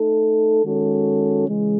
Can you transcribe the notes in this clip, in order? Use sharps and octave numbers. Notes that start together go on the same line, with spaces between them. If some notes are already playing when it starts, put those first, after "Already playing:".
Already playing: A3 D#4 A4
D#3 G#3 C#4 F#4 A4
C#3 E3 G#3